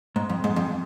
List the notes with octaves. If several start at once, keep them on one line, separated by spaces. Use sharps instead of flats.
G#2
F2
G#2
F2